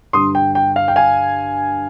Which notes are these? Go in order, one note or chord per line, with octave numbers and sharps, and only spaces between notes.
G2 D3 C6 D#6
G5
G5
F5
G5
F5 G#5